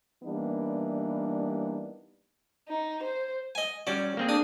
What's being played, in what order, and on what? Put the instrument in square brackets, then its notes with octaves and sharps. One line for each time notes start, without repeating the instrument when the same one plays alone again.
[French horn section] E3 G3 A#3 B3 D4 D#4
[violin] D#4
C5
[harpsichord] D#5 G#5
[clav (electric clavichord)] G3 C#4 F#4 [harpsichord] D5
[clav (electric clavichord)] A#3 C4 G#4
[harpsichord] D4 D#6